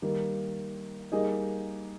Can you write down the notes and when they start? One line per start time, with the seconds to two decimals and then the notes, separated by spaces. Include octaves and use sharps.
0.02 D#3 G3 A#3
1.12 G3 A#3 D#4 G#4 D#5